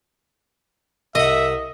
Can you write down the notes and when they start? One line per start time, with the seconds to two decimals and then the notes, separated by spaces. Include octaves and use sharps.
1.15 C2 D#5 E5 F#5